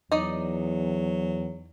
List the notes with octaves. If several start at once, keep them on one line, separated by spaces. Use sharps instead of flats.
E2 F#3 D#4 D5 D#5